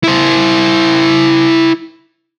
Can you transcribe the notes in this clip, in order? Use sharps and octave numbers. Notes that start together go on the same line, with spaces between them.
E4 C5